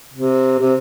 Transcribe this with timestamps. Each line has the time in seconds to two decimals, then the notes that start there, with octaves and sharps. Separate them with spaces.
0.14 C3
0.59 C3